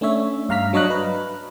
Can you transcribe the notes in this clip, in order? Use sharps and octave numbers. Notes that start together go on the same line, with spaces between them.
A3 C#4 D4 C#5 E5
G2 F5 A#5 F6 B6
F#3 D4 C#5 D#5 A#5 F#6
B4